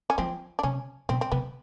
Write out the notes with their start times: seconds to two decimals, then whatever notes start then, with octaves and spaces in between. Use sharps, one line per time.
0.10 C#4
0.18 F3 C4
0.59 D4
0.63 C3 C#4
1.09 B2 C4
1.21 C4
1.32 C3 B3